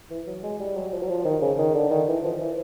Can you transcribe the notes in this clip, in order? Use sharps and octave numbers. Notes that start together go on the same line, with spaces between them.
E3
F#3
G#3
G3
F#3
F3
F#3
F3
D#3
C#3
D#3
D3
D#3
E3
F3
E3